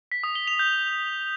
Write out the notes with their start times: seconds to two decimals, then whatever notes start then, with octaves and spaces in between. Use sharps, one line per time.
0.12 B6
0.23 D#6
0.35 G7
0.47 F7
0.59 G6